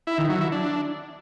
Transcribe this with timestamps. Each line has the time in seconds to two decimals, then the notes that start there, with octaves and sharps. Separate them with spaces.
0.07 E4
0.18 D#3
0.30 F#3
0.41 E4
0.52 D4